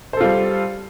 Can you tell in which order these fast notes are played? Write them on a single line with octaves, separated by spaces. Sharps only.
C5 A4 F4 G3